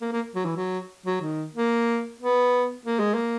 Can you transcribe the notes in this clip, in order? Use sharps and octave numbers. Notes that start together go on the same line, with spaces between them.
A#3
A#3
F#3
E3
F#3
F#3
D#3
A#3
B3
A#3
G#3
A#3